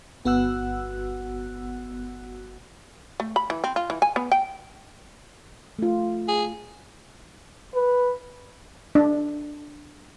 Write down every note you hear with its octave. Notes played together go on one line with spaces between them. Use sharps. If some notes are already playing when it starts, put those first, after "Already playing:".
G1 B3 F#4 F#5 E6 F#6
A3
B5
E3
C4
F4
E3
G#5
B3
G5
A3 F4
G#4
B4
D4